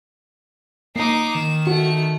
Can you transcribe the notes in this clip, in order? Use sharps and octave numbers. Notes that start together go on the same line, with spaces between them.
A#3 D#4 A#5 D6 C7
D#3 E7
A3 F#4 C#7